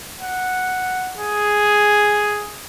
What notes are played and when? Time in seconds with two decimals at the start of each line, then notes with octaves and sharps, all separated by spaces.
0.21 F#5
1.18 G#4